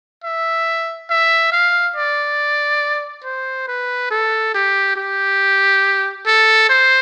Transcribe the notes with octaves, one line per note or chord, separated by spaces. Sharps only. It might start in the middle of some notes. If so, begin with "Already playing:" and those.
E5
E5
F5
D5
C5
B4
A4
G4
G4
A4
C5